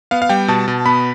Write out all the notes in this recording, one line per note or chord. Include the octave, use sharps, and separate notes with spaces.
B3 F5
F5
G3 G5
B2 A5
B2
B3 B5